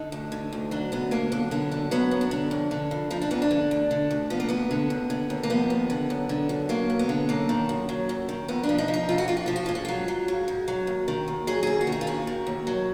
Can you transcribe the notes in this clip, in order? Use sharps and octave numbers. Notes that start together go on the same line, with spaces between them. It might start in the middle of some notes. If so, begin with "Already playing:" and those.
Already playing: D3 D#4
D2
D3
D2
F#3 D4
D2 B3
D3 A#3
F#2 B3
D3 B3
F#2 D4
F#3 B3
F#2
D4
D3
F2
D3
F2
F3 D#4
D4
F2 B3
D4
D3
D2
D3
D2
F3 B3
A#3
D2 B3
D3
D#2
D3
D#2
A#3
F3 B3
D#2
D3
F#2
D3
F#2
F#3 A#3
F#2
B3
D3
F#2 A#3
D#3
F#2
F#3
F#2
D#3
F2 B3
D4
F3
D#4
F3
D#4
F2 F4
F#4
F2 F4
F#4
F3 F4
F#4
G#2 F4
F#4
F#3 F4
F#3
G#2 F#4
G#2
F#3
D#2
D#3
D#2
F#3 G#4
D#2 G#4
F#4
D#3
G#4
F4
D#2 F#4
D#3
D#2
F#3